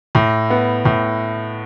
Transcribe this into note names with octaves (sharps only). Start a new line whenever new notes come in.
A2
B3
A2